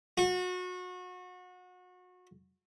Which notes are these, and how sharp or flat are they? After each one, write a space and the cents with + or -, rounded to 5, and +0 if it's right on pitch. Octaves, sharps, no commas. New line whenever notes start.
F#4 -30